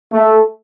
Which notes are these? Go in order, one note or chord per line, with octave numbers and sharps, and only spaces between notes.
A3